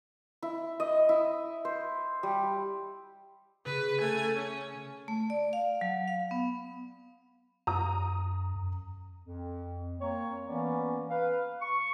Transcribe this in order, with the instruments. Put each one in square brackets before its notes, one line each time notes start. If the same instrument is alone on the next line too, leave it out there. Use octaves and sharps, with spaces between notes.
[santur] E4
D#5
E4
C5
G3
[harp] C#3 [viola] B4
[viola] A3 G#5
C#4
[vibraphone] A3
D5
F5
F#3
F5
B3
[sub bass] F#2 [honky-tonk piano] A#5 D#6
[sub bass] F#2
[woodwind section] F2
A#3 C4 C#5
E3 A#3 B3 C#4 D5
B4 F5
C#6